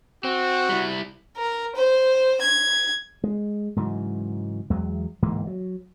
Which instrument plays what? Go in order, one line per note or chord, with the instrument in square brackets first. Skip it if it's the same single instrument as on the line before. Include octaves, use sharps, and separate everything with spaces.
[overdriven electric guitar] C4 [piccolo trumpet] F#4
[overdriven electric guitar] G3 E4
[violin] A#4
C5
G#6
[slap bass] G#3
G#2 C#3 E3 F#3
E2 F#3 G#3
D1 G#2 E3 A#3
F#3